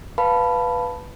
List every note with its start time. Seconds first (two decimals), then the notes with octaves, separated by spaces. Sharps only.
0.18 B4 F5 A5 B5